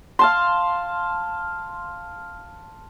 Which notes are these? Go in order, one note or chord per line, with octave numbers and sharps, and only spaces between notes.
F5 A5 C6